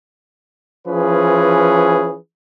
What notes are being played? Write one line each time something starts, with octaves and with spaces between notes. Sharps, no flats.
E3 F3 C#4 G#4 B4